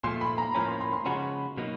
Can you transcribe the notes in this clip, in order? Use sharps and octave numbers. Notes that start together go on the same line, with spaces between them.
A#2 F3 A3 C6
B5
A#5
A2 F3 A#3 C#4 B5
C6
C6
C6
C#3 F3 G#3 C#4 F#4 B5
B2 F#3 A#3 D#4